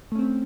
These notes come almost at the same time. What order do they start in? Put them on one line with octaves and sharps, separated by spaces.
A3 C#4 C4